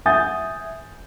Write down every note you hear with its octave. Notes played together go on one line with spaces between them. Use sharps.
E5 F#5 G#5 D#6 G6 A6